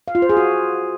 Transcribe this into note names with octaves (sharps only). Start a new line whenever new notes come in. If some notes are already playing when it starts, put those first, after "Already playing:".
F5
F4
C5
G#4
F#4